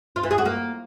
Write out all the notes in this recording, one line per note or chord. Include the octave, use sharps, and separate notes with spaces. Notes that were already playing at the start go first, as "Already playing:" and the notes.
F4
E3
G#4
F#4
A#3